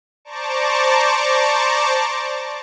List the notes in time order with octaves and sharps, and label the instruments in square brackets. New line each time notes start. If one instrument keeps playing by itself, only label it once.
[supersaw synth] C5 D5 A5 A#5 C#6 D6